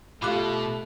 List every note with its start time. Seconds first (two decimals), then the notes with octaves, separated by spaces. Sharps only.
0.22 B2 A3 F4 G4 F5 B5 D6 F#6